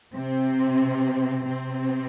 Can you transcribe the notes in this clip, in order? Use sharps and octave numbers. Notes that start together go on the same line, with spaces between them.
C3 C4
C3 C4